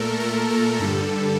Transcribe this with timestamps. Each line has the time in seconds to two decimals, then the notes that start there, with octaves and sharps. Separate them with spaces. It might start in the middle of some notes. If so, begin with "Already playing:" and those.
Already playing: A#2 A3 A4 A#4
0.20 A#4
0.50 A4
0.79 G2 D3 G3 A4